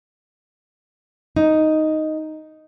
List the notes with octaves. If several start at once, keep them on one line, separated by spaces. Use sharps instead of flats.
D#4